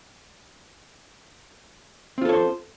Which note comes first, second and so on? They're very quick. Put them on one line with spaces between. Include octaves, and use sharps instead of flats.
C4 F4 A4 C#5 C5